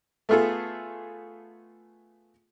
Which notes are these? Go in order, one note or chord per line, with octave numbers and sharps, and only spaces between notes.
A3 B3 F4 G#4 A4